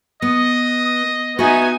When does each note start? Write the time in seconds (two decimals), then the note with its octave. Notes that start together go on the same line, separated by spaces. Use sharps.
0.22 B3 D#5 D#6
1.39 B3 D#4 F#4 E5 G#5